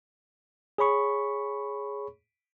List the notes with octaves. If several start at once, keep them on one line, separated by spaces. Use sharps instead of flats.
G#4 C#5 B5 C#6